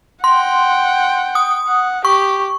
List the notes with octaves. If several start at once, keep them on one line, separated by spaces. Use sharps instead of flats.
F#5 G5 C6
D#6
F#5
G4 C#6